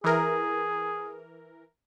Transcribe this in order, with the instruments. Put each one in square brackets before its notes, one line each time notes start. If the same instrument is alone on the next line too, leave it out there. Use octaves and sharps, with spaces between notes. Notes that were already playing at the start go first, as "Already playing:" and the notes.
[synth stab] E3 A#4 [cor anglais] G#4